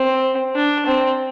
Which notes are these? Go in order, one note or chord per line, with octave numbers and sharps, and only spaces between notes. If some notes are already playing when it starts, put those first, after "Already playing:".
Already playing: C4
D4
C4